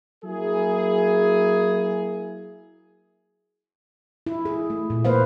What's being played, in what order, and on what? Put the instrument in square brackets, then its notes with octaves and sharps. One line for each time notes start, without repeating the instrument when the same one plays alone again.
[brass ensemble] F#3 A#3 E4 G#4
[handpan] E4
G#4
A3
A#2
A#3 B4 C5 F5